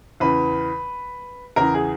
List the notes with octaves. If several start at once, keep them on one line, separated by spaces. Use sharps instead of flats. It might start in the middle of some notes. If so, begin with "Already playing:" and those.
E2 C#3 E3 B4
E2 C#3 E3 A#4
G#4